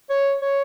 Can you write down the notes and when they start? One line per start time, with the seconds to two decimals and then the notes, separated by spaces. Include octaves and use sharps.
0.10 C#5
0.41 C#5